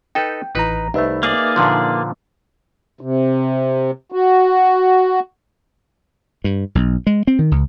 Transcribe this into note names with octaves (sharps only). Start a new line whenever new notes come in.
D#4 A4 B4 G5
A1 E3 D#4 B4 A#5
C2 A3 D#4 B4 E5
A#3 G#4 D5
A#2 D3 F3
C3
F#4
G2
B1
G#3
C4
D#3
C#2